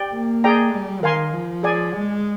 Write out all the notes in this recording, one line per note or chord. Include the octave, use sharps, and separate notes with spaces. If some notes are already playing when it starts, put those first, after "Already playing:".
Already playing: G4 D5 G5
A#3
G#4 D5 G5 A#5
G3
D#3 A#4 F5 G#5 C6
F3
G#4 D5 G#5
G#3